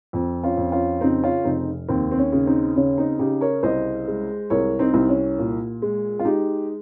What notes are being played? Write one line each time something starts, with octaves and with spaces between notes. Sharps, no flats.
F2
C#4 F4
F2
C#4 F4
C#3 C4 D#4
C#4 F4
F1 C4 D#4
D#2 C4
C4
C#4
C#3
C4 D#4
C#3 C#4
C4 D#4
C#3 D#4 G4
A#4 C#5
C2 C5 D#5
G#3
C2 A#4 C#5
C4 D#4
C2
C#4
A#2
G#3
F4
G#3 D#4 G4